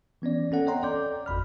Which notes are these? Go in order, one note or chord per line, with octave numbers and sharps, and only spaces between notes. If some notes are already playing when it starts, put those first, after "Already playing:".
E3 B3 C#4 D5
C4 C#4 A4 F#5
C#5 D#5 F#5 G5 A#5 C6
A4 D5 D6 G6
G#1 F2 B5 F6